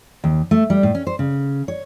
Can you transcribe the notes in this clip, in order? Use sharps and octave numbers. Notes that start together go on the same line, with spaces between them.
D#2
A3
G3
A2
C#4
C5
C#3
C#5